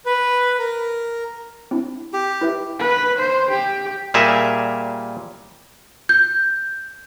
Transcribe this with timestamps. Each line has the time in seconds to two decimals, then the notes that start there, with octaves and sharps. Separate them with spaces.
0.06 B4
0.59 A#4
1.71 C4 D4 E4
2.13 G4
2.41 E4 B4 E5
2.80 B4
3.18 C5
3.51 G4
4.14 A#2 G3 G#4 A#4 E5
6.09 G6